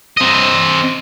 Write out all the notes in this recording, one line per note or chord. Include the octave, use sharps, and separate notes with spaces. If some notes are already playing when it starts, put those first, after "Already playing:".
C4 D#5